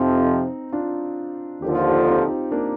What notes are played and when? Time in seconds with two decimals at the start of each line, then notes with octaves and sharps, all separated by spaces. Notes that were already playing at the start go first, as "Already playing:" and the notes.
Already playing: F2 C3 F3 C4 D#4
0.72 D4 F4
1.62 D#2 D3 F3 G4
1.75 F4
1.89 D#4 G4
2.07 C4 D#4
2.51 A#3 D4